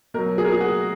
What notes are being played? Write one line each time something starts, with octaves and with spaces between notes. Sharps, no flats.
B2 F#3 A#4
G#4
A#4
G#4
F#4